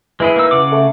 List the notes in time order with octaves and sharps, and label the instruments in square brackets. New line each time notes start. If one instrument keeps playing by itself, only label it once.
[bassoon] E3 [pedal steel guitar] G#3 E4 G#4
[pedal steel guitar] A#3 D#4 E6
C#3 F#5 D6
[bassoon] A3